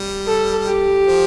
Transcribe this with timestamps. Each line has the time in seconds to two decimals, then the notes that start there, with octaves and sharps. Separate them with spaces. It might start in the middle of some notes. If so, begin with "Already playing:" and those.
Already playing: G3
0.27 A4
0.67 G4
1.07 F3